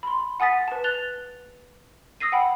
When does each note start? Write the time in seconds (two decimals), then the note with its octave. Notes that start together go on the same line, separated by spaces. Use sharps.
0.03 B5 C6
0.40 F#5 G#5 D#6 A6 B6
0.68 B4 A5
0.84 F#6 A6 F7 G7
2.20 D#6 E6 A#6 C7 D#7
2.32 F#5 G5 B5